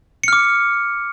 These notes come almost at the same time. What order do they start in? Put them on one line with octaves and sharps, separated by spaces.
C#7 F6 D6